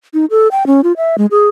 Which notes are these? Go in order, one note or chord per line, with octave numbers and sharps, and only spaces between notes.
D#4
A4
G5
C#4
F4
E5
G#3
G#4